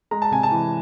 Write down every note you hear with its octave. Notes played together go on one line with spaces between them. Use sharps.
G#3 A#5
A5
C3 G#5
A5
E3